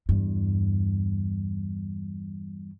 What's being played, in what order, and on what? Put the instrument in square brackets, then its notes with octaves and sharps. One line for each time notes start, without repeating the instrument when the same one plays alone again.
[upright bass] E2 G2